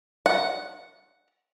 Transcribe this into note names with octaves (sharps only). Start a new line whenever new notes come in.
F#5